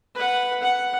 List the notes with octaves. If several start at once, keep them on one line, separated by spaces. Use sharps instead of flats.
B4 F#5
F#5